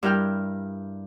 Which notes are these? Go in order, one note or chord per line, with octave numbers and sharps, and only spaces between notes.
G2 E4 A#4 G5 F6